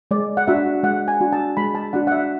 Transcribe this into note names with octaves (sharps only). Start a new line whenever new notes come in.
G#3 D5
F#5
D4 F#4 E5
G#3 F#5
G#5
D4 F#4
A5
G#3 B5
A5
D4 F#4 F#5
F#5
E5